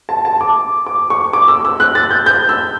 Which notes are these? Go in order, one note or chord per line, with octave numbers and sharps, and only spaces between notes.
A5
A5
D6
D6
C#6
D6
E6
E6
F#6
A6
G6
G6
E6